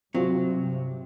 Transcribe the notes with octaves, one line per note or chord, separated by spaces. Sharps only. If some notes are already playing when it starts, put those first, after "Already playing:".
G2 C3 F#3 C4 F4 F#4